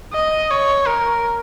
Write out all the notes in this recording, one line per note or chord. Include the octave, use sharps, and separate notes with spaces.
D#5
C#5
A#4